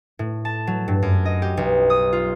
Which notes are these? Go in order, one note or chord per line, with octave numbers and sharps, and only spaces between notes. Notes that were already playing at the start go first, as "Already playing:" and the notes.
A2
A5
F#3
G2
F#2
D#5
G4
B1
D#6
F4